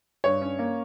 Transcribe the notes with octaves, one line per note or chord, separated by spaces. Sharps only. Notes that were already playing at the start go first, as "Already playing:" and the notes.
G2 C#5
C#4
A#3